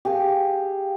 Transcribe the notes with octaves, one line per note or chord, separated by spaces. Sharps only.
G4 G#4 F5